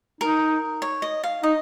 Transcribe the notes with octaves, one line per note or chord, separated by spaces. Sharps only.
D#4 A#4
C#5
D#5
F5
D#4 D#5